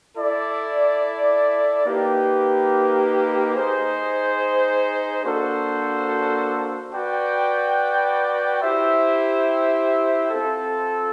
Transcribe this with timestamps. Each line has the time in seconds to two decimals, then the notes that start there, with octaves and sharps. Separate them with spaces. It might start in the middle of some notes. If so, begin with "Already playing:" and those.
0.17 E4 A4 D5
1.85 A#3 D#4 G4 B4
3.55 D#4 G#4 C5
5.23 A#3 D4 F#4 A4 C5
6.93 F#4 B4 D5 G5
8.62 E4 G4 C5 E5
10.30 C4 F4 A4